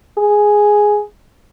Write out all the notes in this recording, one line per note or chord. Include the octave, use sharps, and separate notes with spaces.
G#4